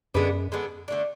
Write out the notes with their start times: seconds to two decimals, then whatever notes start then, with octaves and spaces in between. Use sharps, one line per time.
0.14 F#2 D3 G#3 B3 D4
0.52 D3 G#3 B3 D4
0.88 D3 A3 D4